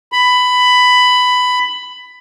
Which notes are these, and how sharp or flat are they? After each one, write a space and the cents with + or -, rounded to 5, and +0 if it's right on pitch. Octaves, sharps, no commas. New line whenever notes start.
B5 +15